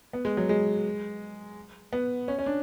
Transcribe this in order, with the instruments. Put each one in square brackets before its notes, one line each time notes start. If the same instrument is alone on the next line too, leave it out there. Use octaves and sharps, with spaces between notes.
[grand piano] B3
G#3
F#3
G#3
B3
C#4
C#4
D4